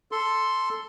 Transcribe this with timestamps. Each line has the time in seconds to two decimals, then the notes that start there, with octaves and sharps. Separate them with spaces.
0.12 A4 C6